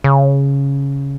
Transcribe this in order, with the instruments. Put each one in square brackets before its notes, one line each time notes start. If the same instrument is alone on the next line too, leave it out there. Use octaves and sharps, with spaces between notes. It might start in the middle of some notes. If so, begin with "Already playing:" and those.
[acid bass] C#3